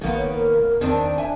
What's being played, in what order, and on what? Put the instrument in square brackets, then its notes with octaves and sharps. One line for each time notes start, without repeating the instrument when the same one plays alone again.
[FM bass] A#1 [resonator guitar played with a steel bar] D#3 A#3 B3
[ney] C#5
A#4
[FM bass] F1
[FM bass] E2 [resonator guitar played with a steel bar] D#3 C4 D4
[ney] D4 [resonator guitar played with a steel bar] E5 G#5